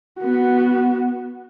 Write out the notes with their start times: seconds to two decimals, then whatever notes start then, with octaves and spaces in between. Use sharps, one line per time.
0.20 B3 F#4